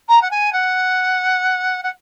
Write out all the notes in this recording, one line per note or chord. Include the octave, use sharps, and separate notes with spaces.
A#5
F#5
G#5
F#5
F#5